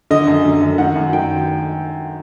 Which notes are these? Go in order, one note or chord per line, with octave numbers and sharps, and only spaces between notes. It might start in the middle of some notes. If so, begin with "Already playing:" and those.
D3 D#5
F#2
D3
F#2
D#3 F#5
F#2
D#3 G5